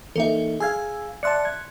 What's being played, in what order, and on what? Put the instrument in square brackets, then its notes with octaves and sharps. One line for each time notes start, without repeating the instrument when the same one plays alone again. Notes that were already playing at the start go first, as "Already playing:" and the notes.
[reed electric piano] E3 A#3 D#4 [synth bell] A4 E5
[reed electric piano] G#4 F5 [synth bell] G#5 E6 G#6
[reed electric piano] D5 E5 A5 [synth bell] C6 F#6 C#7
[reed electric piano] G#6